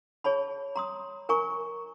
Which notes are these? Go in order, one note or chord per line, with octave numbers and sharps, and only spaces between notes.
G#4 C#5 A5 B5
A#5 C6 D#6
A#4 G#5 A#5 C#6